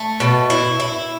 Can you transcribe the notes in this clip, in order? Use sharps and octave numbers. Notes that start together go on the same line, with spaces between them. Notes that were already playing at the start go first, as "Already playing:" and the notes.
Already playing: A3
B2
E4
E4